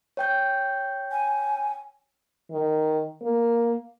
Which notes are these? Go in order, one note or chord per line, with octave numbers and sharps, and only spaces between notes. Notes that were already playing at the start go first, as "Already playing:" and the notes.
C#5 G5 G6
G#5
D#3
A#3